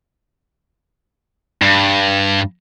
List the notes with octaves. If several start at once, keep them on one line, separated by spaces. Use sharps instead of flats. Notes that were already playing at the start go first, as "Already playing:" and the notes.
G2